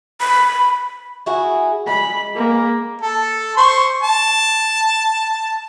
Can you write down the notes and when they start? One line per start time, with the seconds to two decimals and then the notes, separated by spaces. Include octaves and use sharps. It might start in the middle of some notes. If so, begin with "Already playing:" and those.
0.20 B5
1.26 E4 F#4 G#4
1.87 G#3 B5
2.35 A#3
3.01 A4
3.57 C5 C6 C#6
4.03 A5